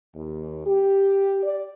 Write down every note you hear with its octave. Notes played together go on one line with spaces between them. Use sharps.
D#2
G4
D5